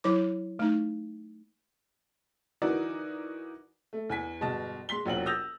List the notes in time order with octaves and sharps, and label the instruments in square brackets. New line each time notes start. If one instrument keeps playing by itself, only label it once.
[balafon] F#3 E4 D6
A3 D#4
[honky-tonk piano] E3 D#4 F#4 A#4 D5
[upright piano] A3
E2 G#5 B6
G1 B2 G#3 D#5 A5
G#3 C6 B6 G7
E1 A#1 F#3 F#5 G5 F#7
D#6 E6 G6 A6 A#6 F7